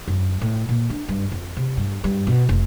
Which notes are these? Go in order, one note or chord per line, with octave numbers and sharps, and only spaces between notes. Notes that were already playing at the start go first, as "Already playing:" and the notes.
F#2
A2
A#2
D4
G2
F2
C3
G2
G2
B2
F1